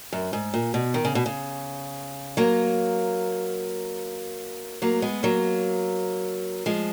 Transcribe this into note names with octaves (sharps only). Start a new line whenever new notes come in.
F#2
G#2
A#2
B2
D#3
C#3
B2
C#3
F#3 A#3
F#3 A#3
G#3 B3
F#3 A#3
F3 G#3